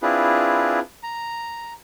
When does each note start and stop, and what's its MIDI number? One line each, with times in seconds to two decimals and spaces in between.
0.02 0.79 60
0.02 0.79 62
0.02 0.79 64
0.02 0.79 65
0.02 0.79 68
0.02 0.79 71
1.03 1.73 82